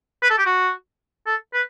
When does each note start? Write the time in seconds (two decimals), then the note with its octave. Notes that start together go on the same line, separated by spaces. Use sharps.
0.22 B4
0.30 A4
0.38 G4
0.46 F#4
1.26 A4
1.54 B4